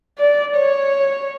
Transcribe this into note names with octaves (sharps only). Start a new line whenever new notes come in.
D5
C#5